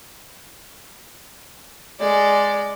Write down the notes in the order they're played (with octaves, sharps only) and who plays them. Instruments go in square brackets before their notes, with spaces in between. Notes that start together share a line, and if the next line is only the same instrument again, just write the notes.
[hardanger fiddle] G#3 D5